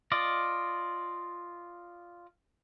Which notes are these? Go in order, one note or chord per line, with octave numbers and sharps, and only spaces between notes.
F4 D5 D#5